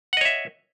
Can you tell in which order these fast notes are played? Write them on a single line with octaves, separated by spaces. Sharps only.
F#5 D#5 C#5 E5